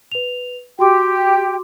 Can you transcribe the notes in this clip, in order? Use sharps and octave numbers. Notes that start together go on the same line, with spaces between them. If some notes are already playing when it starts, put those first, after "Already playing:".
B4 F7
F#4 G4 G5 C6 D6